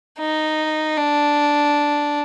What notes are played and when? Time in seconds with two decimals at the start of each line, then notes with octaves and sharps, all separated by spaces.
0.19 D#4
0.96 D4